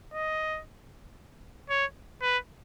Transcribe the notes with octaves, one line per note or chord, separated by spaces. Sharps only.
D#5
C#5
B4